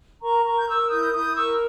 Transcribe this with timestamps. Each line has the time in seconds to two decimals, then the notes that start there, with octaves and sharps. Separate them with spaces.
0.22 A#4 A#5 C#6
0.44 A#4 A#5 C#6
0.58 G6
0.67 A#4 C#6 E6
0.90 E4 D#6 G6
1.12 E4 D#6 G6
1.35 A#4 C#6 E6